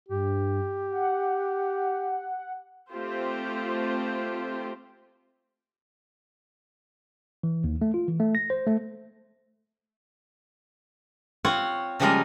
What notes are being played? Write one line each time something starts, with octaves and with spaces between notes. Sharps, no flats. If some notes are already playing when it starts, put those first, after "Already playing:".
G2 G4
F#5
A3 C4 F4 G4 C5
E3
D#2
A3
F4
E3
A3
A#6
C5
A3
C4 F4 C#5 F#5
C#3 F3 G3 G#3 A#3 A#4